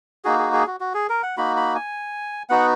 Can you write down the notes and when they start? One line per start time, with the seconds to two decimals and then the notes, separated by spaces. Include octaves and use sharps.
0.25 A#3 D#4 F#4 G#4
0.39 G#4
0.53 G#4
0.67 F#4
0.80 F#4
0.94 G#4
1.09 A#4
1.23 F#5
1.37 A#3 D#4 F#4 B5
1.57 B5
1.75 G#5
2.50 B3 D#4 F#4 F#5